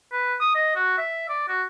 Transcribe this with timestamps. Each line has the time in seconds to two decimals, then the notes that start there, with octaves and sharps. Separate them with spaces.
0.12 B4
0.40 D#6
0.55 D#5
0.76 F#4
0.98 E5
1.29 D5
1.48 F#4